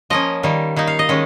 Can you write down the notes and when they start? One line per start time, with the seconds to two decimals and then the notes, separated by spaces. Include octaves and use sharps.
0.10 F3 A#3 C#4 D#5
0.43 D#3 G3 A#3
0.76 D#3 A#3 D#4
0.87 F5
0.99 D#5
1.09 D#3 G#3 C#4